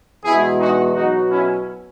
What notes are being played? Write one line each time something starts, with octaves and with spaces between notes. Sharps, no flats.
E2 B2 G#3 E4 G#4
D#4 F#4
B2 F#3 D#4 F#4
C#4 E4